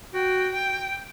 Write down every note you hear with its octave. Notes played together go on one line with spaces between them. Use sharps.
F#4 G5
G5